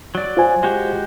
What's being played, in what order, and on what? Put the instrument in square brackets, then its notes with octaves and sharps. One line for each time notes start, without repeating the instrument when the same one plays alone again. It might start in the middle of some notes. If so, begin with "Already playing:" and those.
[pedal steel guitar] F#3 D5
[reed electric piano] F4 C5 G#5
[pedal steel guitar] G#3 F#4 G4